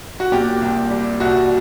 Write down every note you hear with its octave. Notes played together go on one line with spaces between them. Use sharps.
F#4
A#2 G4
C2
G3
C2 F#4